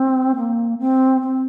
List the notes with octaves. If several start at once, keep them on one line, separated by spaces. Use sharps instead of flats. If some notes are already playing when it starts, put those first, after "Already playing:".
Already playing: C4
A#3
C4
C4